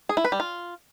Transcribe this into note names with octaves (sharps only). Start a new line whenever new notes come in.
G#4
E4
B4
G3
F4